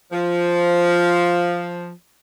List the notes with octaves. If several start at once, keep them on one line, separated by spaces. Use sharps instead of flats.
F3